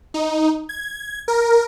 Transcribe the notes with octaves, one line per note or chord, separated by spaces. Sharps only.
D#4
G#6
A#4